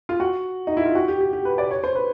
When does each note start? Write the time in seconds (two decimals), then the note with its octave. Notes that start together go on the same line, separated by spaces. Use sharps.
0.09 F4
0.20 F#4
0.67 D#4
0.77 E4
0.86 F4
0.95 F#4
1.08 G4
1.21 G4
1.33 G4
1.45 B4
1.58 D5
1.71 C#5
1.84 C5
1.95 B4